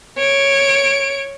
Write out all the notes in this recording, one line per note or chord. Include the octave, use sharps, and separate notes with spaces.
C#5 D7